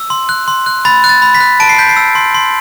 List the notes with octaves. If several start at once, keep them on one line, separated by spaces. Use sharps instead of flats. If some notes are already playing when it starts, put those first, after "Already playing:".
Already playing: E6
C6
F#6
C6
F#6
B5 A6
F#6
A6
B5
B6
F#6
A5 D7
C7
G6 B6
C7
E6
C6
C6